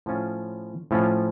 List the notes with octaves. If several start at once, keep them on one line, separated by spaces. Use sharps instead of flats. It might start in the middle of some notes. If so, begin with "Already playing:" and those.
A2 F3 C#4 F4
A2 F3 C#4 F4